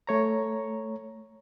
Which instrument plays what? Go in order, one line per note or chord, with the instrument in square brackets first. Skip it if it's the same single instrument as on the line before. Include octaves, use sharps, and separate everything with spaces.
[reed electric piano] A3 C#5 A#5